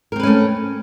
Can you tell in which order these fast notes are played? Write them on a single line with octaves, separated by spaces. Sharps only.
A#4 C4 B4 C#4 A3